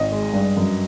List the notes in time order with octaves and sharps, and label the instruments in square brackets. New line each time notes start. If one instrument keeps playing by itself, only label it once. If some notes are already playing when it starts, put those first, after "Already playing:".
Already playing: [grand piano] G#1 D#5
G#3
G2
F#2